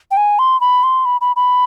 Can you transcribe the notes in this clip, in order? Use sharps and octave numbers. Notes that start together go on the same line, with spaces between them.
G5
G#5
C6
B5
C6
B5
B5
B5